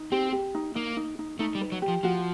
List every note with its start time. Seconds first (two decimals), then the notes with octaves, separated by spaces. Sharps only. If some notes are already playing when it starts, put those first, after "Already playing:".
Already playing: D#4
0.12 C4 G4
0.32 G4
0.55 D#4
0.75 A#3 D#4
0.97 D#4
1.19 D#4
1.39 A3 D#4
1.55 G3
1.61 B4
1.72 F#3
1.82 G4
1.88 F3
2.03 F3 F#4